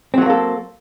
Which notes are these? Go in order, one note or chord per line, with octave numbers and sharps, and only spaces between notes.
F#3 A3 A#3 C4 A4